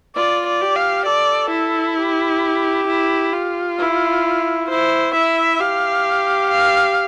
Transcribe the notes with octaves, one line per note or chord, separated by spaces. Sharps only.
F4 D5
D5
G4
F5
A4 D5
E4
G4
E4
F4
E4
E4 C5
E4 E5
G4 F5
F5